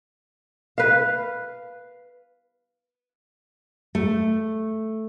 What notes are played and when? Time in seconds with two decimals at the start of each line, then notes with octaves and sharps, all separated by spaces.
0.78 B4 F5
3.95 A3